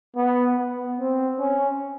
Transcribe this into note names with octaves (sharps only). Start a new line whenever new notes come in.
B3
B3
C4
C#4